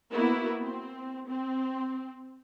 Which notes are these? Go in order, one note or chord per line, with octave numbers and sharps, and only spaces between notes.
A#3 B3 E4 F#4
C4
C4